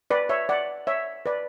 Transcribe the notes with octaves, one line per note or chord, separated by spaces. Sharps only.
B4 D5
C#5 E5
D5 F#5
C#5 E5
B4 D5